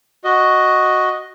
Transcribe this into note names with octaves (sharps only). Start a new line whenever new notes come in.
F#4 D#5